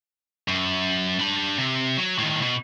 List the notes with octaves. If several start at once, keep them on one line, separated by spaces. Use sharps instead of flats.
F#2
D4 B5
C3
F#3
A2 D#3
B2